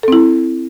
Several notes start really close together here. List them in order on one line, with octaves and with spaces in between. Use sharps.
A4 C4 E4